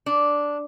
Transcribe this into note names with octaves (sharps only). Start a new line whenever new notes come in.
D4